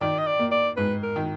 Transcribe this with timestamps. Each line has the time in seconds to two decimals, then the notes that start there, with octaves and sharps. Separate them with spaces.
0.01 D#3 D5
0.19 D#5
0.27 D5
0.39 A#3
0.51 D5
0.77 G#2 B4
1.03 A#4
1.16 D#3